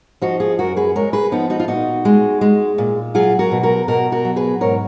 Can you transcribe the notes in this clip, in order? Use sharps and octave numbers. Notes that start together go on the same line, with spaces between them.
F3 D#4 F#4
F4 G#4
F#2 F#4 A#4
G#4 B4
G#3 A#4 C#5
G#4 B4
F3 B3 D#4
D#4 F#4
F4
A#2 D#4 F#4
G#3
G#3
A#2
F#3 F4 G#4
F#4 A#4
B2
F#4 A#4
B2 F#4 A#4
F#4 A#4
F#3
G#4 B4
G#2 A#4 C#5